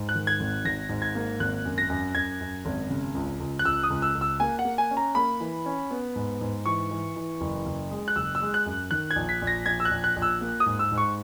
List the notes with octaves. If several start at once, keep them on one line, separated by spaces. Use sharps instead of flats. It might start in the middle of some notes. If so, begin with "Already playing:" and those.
Already playing: G#2
F#6
D#3
G#6
G#1
G#1 A#6
G#2
G#6
A#3
G#1 F#6
F#2
A#6
F#2
F#2 G#6
F#2
G#1
C#3
C#2
C#2
F#6
C#2 E6
D#6
C#2
E6
C#2
E6
A#3 G#5
F#5
A#3
G#5
C#4
A#5
A#3 B5
E3
C#4
B3
G#2
G#2
E3 C#6
E3
E3
F#1
F#1
G#3
F#6
F#1 E6
E6
G#3
F#6
F#2
D#3 F#6
G#6
A#1
B6
A#1
A#6
A#1 G#6
E6
F#6
A#1
F#6
A#1
E6
A#3
D#6
G#2
E6
G#2
C#6